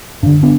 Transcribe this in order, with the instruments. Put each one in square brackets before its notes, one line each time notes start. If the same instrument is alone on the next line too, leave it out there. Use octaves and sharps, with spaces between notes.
[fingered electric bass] G2 D3 D4
B3 D4